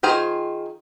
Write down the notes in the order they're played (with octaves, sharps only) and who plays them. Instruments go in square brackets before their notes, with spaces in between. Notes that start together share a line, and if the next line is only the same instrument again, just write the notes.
[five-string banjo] D#3 F4 G#4 C5 G#5